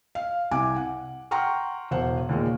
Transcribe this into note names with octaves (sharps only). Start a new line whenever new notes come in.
F5
C2 C3 G#5 D6
F#5
F#5 G5 A#5 C6 C#6 F6
E1 C5 F#5
D#2 A#2 G#3